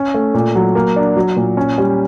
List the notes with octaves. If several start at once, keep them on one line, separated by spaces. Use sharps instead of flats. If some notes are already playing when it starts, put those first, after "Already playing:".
Already playing: C#4
A3
A#2
F#3
A#3
D4
F#3
A#2
C#4
G3